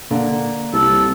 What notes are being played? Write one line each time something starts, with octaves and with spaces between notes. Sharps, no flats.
D3 A#3
C2 A4